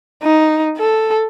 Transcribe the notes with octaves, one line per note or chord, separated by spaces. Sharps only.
D#4
A4